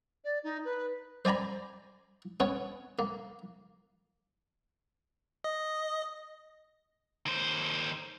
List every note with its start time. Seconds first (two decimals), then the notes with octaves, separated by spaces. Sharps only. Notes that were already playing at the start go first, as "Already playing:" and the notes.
0.24 D5
0.43 D#4
0.64 B4
1.25 C5 D5 G#5 A#5 B5
2.40 B3 C#4 C#5
2.99 A#3
5.44 D#5
7.26 D#2 C5